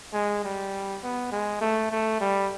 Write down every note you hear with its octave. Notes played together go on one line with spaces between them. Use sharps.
G#3
G3
B3
G#3
A3
A3
G3